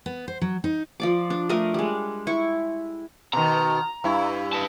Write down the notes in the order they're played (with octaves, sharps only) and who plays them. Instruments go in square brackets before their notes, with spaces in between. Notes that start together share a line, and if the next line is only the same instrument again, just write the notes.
[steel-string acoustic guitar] B3
C5
F#3
D#4
[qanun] F3 D5 D6
D4
A3 D4 A#4 D#5
G3 G#3
E4 C#6
[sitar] B2 D#3 [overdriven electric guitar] A#5
[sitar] G2 E4
[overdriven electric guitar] B4 A5